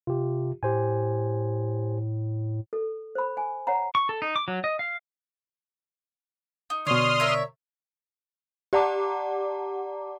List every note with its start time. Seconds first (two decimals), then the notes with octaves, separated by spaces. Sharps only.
0.07 C3 F4 G4
0.63 A2 G4 C5 G#5
2.73 A4
3.15 C5 B5
3.37 G#5
3.67 C#5 F#5 A#5
3.95 C#6
4.09 A4
4.22 D#4
4.36 D6
4.48 F#3
4.64 D#5
4.79 F5
6.70 D#4
6.87 B2 D3 C#5 D5 C6 D#6 F6
7.20 A#4 C#5 E5
8.73 G4 D5 F#5 A5 A#5 D6